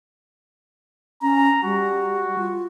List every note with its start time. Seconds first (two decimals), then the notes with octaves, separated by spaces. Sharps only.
1.22 C#4 A#5
1.63 G3 F#4
2.38 F4